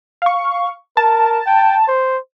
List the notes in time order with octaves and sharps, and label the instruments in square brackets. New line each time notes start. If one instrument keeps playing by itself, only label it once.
[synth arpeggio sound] F5 C#6
[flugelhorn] A#4 [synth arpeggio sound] A5
[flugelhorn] G5
C5